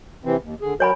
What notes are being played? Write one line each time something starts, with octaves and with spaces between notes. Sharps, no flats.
C3 E3 C4
D#2
D3 G#4
F#3 F#4 A#4 C#5 G#5 B5